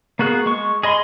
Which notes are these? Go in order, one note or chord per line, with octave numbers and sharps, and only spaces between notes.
A#3 B3 F#4 G#4 F#6
G#3 C#6
G#4 D#5 B5 C6